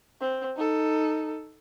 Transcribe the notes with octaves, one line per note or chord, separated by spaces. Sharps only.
C4
D#4 A4